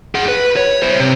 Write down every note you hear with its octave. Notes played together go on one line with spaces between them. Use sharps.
G#4 F#5
B4
C#5
E4 C5
C3